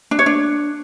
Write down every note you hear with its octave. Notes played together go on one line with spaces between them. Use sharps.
D4
C#5
D4